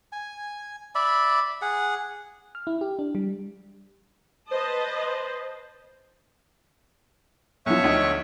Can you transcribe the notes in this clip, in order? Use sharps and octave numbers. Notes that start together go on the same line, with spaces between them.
G#5
D5 E5 B5
G#4 F#5
F6
E4
G4
D4
G3
B4 C5 D#5 A5
B1 F3 C#5 E5 C#6
D2 D#4